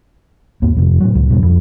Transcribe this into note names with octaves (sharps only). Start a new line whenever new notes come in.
D#2 G#2 A#3
F2 C3
A2 F#3
C#2
E2 G2 B2
F2